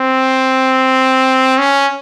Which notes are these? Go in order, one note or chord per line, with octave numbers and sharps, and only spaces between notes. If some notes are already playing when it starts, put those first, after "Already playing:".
Already playing: C4
C#4